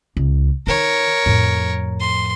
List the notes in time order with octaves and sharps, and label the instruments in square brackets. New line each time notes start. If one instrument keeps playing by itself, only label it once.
[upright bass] C#2
[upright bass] D#3 [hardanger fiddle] A#4 C#5
[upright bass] F2 A2
[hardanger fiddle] C6